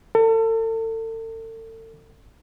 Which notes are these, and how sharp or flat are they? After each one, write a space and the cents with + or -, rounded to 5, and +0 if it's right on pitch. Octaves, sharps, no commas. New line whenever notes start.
A4 +35